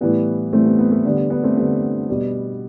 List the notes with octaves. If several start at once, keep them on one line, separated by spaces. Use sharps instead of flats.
A2 E3 G3 B3
A2 E3 G3 A3 C4
B3
B3
A3
D3 G3 B3
B3
B3 D4
A3 C4
D3 G3 B3
B2 G3